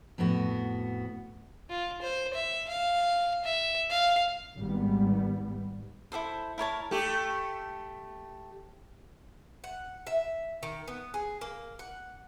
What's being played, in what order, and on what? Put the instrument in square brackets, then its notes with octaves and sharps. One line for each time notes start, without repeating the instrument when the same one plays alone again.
[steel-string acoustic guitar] F2 A2 B3 F#4
[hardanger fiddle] F4
C5
E5
F5
E5
F5
[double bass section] G#1 G3 B3
[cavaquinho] E4 G#4 A4 C5
E4 A#4 C#5 A5
[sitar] A3 G4
[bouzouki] F#5
E5
D#3
B3
G#4
A#3
F#5